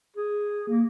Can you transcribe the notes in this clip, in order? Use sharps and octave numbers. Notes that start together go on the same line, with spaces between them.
G#4
A#3